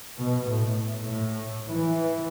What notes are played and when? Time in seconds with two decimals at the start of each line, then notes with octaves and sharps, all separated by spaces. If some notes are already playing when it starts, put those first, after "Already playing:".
0.19 B2
0.48 A2
1.04 A2
1.68 E3